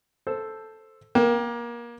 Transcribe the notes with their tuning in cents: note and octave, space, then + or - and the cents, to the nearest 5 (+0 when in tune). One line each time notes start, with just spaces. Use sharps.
A4 +0 C5 +0
A#3 +25 G5 +0